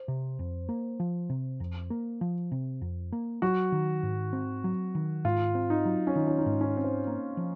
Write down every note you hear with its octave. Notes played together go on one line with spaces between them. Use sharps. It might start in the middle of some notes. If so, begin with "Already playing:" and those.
Already playing: C5
C3
F2
A#3
F3
C3
F2
A#3
F3
C3
F2
A#3
F#3 F#4
D#3
G#2
C4
F#3
D#3
G#2 F4
C4
D#4
F#3
C#4
D#3 D#4
C#4
D#4
G#2
C#4
C4
C5
A#3
F3